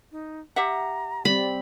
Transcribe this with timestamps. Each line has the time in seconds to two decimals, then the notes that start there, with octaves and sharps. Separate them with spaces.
0.12 D#4
0.56 G4 E5 F#5 A#5
1.25 G3 C4 D5 B5